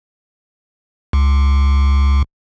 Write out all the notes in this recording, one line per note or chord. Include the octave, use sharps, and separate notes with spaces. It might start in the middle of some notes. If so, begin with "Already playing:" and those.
C#2